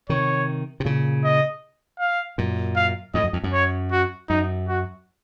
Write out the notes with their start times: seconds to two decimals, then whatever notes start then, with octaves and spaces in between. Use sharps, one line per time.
0.09 C3 D#3 C#5
0.80 C3
0.85 A#2 C#3
1.24 D#5
1.99 F5
2.38 F#2 A#2
2.76 F5
3.14 F2 A2 D#5
3.24 F#2
3.33 F2
3.44 F#2
3.53 C#5
3.91 F#4
4.29 F#2 D#4
4.68 F#4